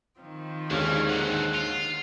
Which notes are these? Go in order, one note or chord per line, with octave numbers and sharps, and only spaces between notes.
D#3 F3 C4
D#2 D3 E3 G#3 C#4
C#3 E3 F#5
F4